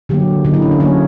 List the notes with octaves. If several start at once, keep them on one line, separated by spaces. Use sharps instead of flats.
D3 F#3 A#3 G4
D3 F#3 A#3 D#4
E4
C#4
D4
D3 F#3 A#3 C#4